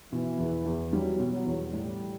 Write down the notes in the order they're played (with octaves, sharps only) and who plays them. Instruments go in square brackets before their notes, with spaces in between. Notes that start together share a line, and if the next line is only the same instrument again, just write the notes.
[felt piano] B2 [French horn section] E3
[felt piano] E2
E2
[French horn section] F#3 [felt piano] G3
[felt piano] B2
[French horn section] F#3
[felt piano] E2
[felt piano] A2 [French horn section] G3